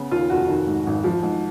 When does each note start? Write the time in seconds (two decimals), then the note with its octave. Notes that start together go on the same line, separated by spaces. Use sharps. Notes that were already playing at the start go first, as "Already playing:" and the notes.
Already playing: C#3 B3
0.11 D#2 F4
0.30 F1 F#4
0.48 D#3
0.67 G#2
0.87 G#1
1.04 F3
1.23 G#2